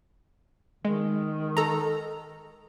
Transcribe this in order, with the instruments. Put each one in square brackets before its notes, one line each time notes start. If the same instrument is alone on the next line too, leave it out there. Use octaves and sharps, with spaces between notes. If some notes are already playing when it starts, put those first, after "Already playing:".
[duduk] D#3 [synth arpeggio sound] G#3
[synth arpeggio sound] A4 A#5